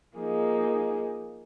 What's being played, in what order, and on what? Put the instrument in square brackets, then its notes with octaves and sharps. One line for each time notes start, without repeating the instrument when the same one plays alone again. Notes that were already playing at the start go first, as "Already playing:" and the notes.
[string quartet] F3 A#3 D#4 G#4